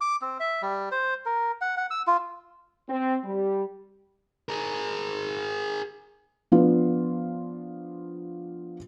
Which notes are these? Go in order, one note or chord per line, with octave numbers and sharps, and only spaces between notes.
D6
C4
E5
G3
C5
A#4
F#5
F#5
E6
F4
C4
G3
G#4 A#4
F3 B3 D4 F4